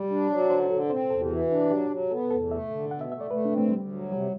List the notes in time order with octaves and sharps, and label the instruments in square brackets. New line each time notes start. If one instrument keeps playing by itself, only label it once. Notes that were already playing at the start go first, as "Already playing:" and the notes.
Already playing: [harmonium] G3 [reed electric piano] D5
[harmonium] D4
F#3
[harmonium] D3 [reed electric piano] C5
[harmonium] D3 [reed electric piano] A4
[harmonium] C4 [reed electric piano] C5
[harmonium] E2 [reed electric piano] A4
[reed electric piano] G4
[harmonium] E3 [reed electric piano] F#4
[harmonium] D4
[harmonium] F#3 [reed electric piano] G4
[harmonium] F#3
[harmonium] B3 [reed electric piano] A4
[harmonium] E2 [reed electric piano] A4
[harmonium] A3 [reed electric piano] E5
[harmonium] D3
[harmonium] B2 [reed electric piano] F#5
[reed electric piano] E5
[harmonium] A3 [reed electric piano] E5
[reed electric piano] D5
[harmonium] A3 [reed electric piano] B4
[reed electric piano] D4
[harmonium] C4
[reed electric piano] A3
[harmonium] D2 [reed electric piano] G3
[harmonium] F#3
[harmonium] C3 [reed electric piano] G3